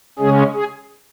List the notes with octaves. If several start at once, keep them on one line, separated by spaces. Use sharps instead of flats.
C#3 G#3 C#4 G#4
G#4